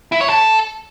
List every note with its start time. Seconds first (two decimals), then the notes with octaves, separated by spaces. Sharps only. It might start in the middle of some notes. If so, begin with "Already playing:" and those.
0.12 E4
0.21 C#5
0.29 A4